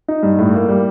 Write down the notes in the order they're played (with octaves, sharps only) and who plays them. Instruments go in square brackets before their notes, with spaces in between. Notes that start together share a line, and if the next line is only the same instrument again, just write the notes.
[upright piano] D#4
G2
A2
A#3
G3